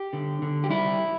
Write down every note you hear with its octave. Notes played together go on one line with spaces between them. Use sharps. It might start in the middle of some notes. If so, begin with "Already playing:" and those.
Already playing: G4
D3
D3
G4
G3 E4